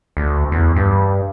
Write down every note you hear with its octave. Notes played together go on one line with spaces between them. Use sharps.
D2
E2
G2